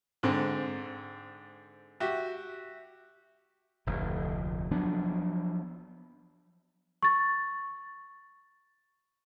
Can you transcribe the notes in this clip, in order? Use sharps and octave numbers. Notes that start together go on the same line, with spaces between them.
G#2 D3 C4
F#4 G4 E5
F1 D2 A2
F3 F#3 B3 D4
C#6 A6